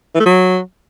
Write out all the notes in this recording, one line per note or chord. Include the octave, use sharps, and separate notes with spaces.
E3
A3
F#3